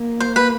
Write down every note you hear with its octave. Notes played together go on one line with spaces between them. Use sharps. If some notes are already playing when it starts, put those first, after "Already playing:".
Already playing: A#3
C5
B4